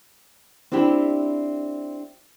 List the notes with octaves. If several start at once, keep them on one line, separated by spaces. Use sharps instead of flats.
C4 D4 E4 G4